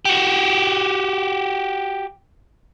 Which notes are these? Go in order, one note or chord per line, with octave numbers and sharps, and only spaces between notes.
F#4 G4